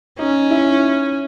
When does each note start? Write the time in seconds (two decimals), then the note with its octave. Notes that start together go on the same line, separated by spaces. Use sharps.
0.19 C#4 D#4
0.50 E4